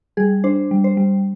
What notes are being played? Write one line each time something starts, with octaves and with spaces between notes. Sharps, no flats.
G3 G#4
D4 C5
G3
C5
G3